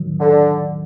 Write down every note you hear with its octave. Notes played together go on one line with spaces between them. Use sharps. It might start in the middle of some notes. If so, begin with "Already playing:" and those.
Already playing: D#3 F#3
D3